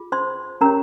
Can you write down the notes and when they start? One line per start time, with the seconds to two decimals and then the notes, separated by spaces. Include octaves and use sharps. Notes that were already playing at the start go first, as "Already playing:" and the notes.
Already playing: F4 G#4
0.12 C5 C6
0.61 C#4 G4 A#4 C#5 A#5